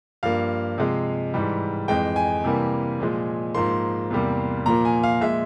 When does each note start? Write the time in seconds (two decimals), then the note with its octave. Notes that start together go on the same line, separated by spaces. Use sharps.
0.23 G2 F3 A#3 F5
0.78 C3 F3 G#3
1.34 G#2 E3 G3
1.88 F2 E3 G#3 G5
2.16 G#5
2.44 C3 E3 G3 A#3
3.00 A#2 F3 G#3
3.55 G#2 F3 A#3 C6
4.10 E2 C3 G3 A#3
4.66 A#2 F3 A#3 A#5
4.85 G#5
5.03 F5
5.21 A#2 F3 G#3 E5